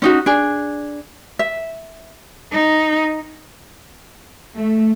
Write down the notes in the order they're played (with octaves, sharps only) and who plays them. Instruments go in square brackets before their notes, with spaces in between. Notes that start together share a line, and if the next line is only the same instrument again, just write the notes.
[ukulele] C#4 D#4 F#4
D4 G#4
E5
[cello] D#4
[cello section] A3